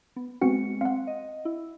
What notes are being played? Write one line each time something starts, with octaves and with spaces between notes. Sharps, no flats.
B3
G#3 B3 C4 F#4 C#7
C4 F5 F#5
D#5
E4